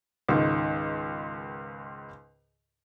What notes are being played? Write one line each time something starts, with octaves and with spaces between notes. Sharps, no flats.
C#2 G#2 D#3